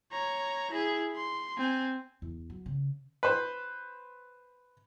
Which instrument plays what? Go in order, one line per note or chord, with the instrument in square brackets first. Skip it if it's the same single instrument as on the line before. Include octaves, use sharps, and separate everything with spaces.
[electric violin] C#5 A#5
E4 G#4
C6
C4 G#5
[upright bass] E2
F#3
C#3
[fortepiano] B4 C5